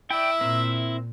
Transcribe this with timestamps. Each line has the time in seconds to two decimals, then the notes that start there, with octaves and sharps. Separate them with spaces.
0.11 E4 D5 E5 G5
0.41 A#2 C4 A#4